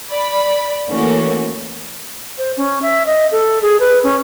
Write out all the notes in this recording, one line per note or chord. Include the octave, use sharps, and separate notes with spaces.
D5 B5
E3 A3 A#3 C#4 F#4
C5
C#4
E5
D#5
A4
G#4
B4
C#4